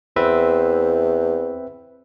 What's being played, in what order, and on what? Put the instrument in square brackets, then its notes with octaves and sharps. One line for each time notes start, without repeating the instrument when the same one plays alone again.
[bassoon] E2 [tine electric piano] C4 B4 E5